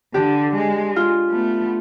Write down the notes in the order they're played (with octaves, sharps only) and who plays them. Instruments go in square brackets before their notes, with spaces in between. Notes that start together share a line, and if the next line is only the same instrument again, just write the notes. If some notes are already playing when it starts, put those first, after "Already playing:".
[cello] D3 [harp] D4 G4
[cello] G#3
[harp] F4
[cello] A3 B3